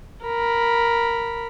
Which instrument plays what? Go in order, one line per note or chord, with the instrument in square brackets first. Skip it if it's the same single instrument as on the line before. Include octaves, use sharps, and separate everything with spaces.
[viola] A#4 B5